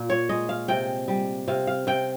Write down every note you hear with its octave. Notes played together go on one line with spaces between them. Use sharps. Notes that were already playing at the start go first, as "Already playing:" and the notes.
Already playing: A#2
C#5
G#3 D#5
F5
C3 G5
G3
C3 F5
F5
C3 G5